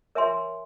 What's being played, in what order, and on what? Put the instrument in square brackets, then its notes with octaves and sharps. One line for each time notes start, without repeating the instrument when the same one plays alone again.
[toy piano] A#4 C#5 E5 G#5 C6